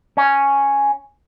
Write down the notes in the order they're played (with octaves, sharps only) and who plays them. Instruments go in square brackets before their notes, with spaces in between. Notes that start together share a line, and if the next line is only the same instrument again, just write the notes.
[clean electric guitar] C#4